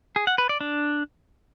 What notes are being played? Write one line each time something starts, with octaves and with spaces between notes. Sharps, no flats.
G#4
F#5
B4
D5
D4